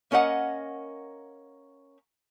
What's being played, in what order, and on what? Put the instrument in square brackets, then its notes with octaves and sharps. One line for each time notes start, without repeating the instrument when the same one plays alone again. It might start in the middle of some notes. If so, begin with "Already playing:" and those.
[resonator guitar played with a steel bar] A#3 C#4 A#4 D#5 F#5